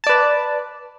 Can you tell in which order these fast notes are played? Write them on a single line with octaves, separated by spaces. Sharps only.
A5 D5 B4